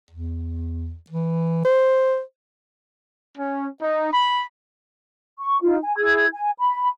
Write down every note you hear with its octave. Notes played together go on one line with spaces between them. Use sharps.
E2
E3
C5
C#4
D#4
B5
C#6
D#4 F4
G#5
E4 G#4 E6 G#6
G#5
B5